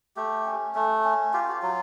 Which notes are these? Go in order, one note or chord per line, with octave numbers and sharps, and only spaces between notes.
A3 G4
C#4
A3
C#4
F4 G4
F#4
G4
F#3